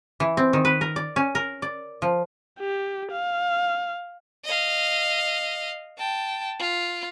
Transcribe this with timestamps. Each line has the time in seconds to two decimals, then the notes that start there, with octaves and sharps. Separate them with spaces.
0.20 E3
0.37 C4
0.53 D#3
0.65 B4
0.81 A#4
0.96 D5
1.16 C#4
1.35 A#4
1.62 D5
2.02 F3
2.60 G4
3.12 F5
4.44 D#5 F5
5.98 G5 A5
6.59 F4